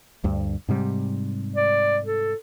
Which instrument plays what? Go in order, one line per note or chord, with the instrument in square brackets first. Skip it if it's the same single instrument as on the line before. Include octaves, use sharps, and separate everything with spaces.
[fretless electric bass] D2 G2
G#2 C3 G3
[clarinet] D5
A4